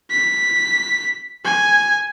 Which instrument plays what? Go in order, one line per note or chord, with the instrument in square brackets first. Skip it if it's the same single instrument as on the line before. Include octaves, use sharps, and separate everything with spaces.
[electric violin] B6
G#5